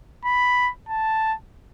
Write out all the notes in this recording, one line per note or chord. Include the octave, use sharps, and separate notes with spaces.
B5
A5